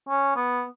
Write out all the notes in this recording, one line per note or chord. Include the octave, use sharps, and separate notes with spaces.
C#4
B3